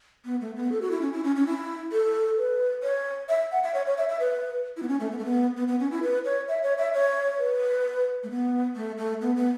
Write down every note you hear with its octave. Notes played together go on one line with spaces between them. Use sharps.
B3
A3
B3
A4
F#4
E4
C#4
E4
C#4
C#4
E4
A4
B4
C#5
E5
F#5
E5
C#5
C#5
E5
E5
B4
E4
B3
C#4
A3
B3
A3
B3
B3
B3
C#4
E4
B4
C#5
E5
C#5
E5
C#5
B4
A3
B3
A3
A3
B3
B3